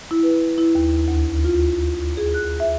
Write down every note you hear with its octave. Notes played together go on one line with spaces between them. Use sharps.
E4
B4
E4
D#2
D2
F4
G#4
F#6
E5